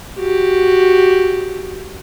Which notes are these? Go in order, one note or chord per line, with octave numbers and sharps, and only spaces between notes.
F#4 G4